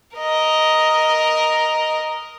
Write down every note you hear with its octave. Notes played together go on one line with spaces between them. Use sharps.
A#4 D#5